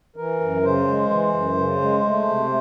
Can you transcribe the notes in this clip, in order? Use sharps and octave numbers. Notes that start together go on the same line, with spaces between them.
E3 A#4
F#2
C#3 C5
G#3
E3
F#2
C#3
G#3
A3
C3